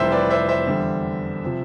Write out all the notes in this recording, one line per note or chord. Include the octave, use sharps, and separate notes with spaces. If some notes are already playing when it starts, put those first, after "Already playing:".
Already playing: F1 F2 E3 G3 C5 E5
B4 D5
C5 E5
C5 E5
E2 D3 G3
C3 F3